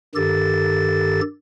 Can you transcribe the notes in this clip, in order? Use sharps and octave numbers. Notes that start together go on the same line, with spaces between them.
G2 D#3 G4 A4 A6